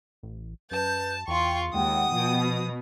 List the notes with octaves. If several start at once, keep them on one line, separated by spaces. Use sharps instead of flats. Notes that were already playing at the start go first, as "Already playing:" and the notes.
A1
F#2 B4 A5 G6
E2 F4 G5 C6 C#6
D#2 G#3 F#5 G5 D#6
B2 F3